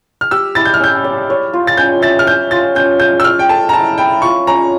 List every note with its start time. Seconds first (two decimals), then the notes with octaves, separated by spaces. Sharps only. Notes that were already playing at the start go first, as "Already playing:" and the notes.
0.21 F6
0.31 G4 E6
0.55 E4 A6
0.65 G6
0.74 F6
0.80 C#4 G6
1.04 D5
1.30 C#5
1.53 F4
1.67 A6
1.77 C#4 G6
2.02 E5 A6
2.19 F6
2.27 C#5 G6
2.51 F4 A6
2.75 C#4 G6
3.00 F5 G6
3.20 E6
3.24 C#5 F6
3.39 G5
3.49 A4 A5
3.69 A#5
3.73 E4 A5
3.98 E4 G5
4.22 F4 C#6
4.47 C#4 A#5